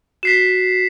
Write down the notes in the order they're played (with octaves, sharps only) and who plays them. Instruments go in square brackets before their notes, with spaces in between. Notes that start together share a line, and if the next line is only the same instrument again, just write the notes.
[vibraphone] F#4 [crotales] B6 C7 E7